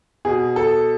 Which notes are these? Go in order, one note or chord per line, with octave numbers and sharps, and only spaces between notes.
B2 G#4
A4